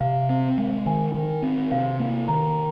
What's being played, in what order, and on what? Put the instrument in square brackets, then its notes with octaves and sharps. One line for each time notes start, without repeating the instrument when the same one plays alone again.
[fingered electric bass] C3 [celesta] F5
[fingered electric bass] C4
G#3
[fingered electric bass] D#3 [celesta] G#5
[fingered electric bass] D#3
C4
[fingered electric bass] C3 [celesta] F5
[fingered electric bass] A#3
[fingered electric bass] D#3 [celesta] A#5